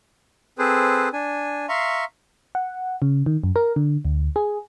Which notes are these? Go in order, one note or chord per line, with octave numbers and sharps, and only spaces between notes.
C4 G#4 A4 B4 C5
D4 G#5
E5 F5 A#5 C6 C#6
F#5
C#3
D#3
F#2
A#4
D3
D2
G#4